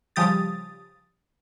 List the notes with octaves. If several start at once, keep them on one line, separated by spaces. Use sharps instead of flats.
C#3 F3 G3 G4 D#6 A6